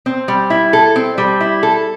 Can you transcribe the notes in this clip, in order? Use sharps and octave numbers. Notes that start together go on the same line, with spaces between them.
C4
G3
E4
A4
C4
G3
E4
A4